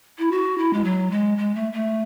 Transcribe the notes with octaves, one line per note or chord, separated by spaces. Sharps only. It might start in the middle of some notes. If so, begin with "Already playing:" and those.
E4
F#4
E4
G#3
F#3
G#3
G#3
A3
A3